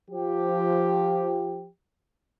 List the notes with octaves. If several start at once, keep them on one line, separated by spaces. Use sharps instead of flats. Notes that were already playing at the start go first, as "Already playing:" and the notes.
F3 G4